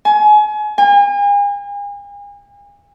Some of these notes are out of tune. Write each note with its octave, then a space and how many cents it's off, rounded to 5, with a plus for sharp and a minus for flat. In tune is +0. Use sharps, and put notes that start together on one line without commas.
G#5 +30
G#5 -40